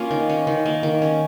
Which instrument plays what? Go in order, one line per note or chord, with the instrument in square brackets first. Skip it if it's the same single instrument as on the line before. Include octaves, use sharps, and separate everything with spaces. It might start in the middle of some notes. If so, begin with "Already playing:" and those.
Already playing: [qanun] A#3 C#4 F4
D#3
C#4
D#3
A#3
D#3
C#4